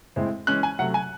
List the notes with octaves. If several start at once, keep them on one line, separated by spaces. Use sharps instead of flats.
A2 G#3 C4 E4
E3 G#3 C#4 F#6
G#5
C3 F#3 A3 F#5
G#5